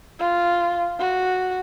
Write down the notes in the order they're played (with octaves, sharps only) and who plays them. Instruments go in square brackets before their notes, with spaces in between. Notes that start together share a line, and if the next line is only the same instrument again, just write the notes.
[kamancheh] F4
F#4